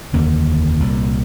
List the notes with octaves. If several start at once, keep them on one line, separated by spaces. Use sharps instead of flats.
F1 D#2 D3 A#3
C2 A#2